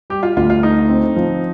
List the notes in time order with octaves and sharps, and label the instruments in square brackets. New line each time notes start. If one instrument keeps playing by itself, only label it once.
[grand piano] G3 [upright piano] G4
[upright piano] F4
[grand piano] D2 [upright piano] F4
[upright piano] F4
[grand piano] A3 [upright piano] D#4
[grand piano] C4
F3